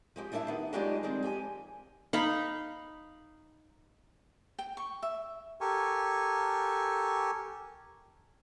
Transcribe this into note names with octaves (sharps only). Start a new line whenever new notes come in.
F3 G#3 G4
G3 D4 E4 A4 E5 F5
D#3 B3
F#3 G#3 D4 D#4 F4 G4
D#3 G3 G#3 C4
F3 G4 G#5
D#4 F5 B5
G5
C#6
E5
G4 A4 A#4 G#5 C#6